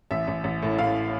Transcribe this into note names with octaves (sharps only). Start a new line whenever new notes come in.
A1 E5
A1
A1
A2
A2 F5